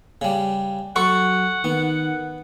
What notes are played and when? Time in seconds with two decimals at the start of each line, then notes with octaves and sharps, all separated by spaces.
0.21 C#3 G3
0.96 F#3 A4 F#5 C#6
1.64 D#3 B3